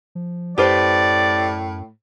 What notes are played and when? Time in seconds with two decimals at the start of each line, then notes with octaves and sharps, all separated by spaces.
0.15 F3
0.58 F#2 A2 G4 B4 C5 D5